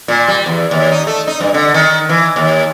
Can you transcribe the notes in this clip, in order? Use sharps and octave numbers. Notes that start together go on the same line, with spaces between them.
A#2
G3
E2
D#2
D#4
A3
D#4
G2
D3
D#3
E3
D#2